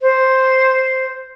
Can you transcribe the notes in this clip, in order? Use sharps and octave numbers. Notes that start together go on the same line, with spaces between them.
C5